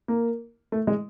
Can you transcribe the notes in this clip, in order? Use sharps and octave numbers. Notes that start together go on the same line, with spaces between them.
A#3
A3
G#3